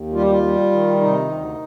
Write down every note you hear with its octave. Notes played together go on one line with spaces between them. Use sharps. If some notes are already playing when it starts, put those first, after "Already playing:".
Already playing: D#2
G3 F4
G4
F4
G3
D#3
C3 D#4
D2